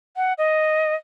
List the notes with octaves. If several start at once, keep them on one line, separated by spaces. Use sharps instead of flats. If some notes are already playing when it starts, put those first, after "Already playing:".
F#5
D#5